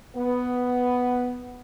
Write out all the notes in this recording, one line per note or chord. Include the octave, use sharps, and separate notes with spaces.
B3